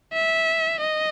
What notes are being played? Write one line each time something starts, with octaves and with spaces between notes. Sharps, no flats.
E5
D#5